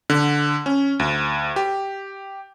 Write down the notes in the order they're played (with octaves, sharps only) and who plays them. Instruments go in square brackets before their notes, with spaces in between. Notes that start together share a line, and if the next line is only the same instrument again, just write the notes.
[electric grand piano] D3
C#4
D2
G4